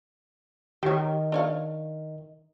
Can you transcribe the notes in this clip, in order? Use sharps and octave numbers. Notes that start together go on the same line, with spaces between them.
D#3 G4 C#5
D4 C#5 F5